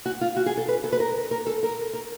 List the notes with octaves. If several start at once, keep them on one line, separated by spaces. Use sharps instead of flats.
F#4
F4
F#4
G#4
A4
B4
A4
B4
A#4
A#4
A4
A#4
A#4